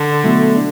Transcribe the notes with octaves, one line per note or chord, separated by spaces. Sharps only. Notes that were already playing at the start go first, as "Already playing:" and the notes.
Already playing: D3
B2 F#3 A3 E4
D4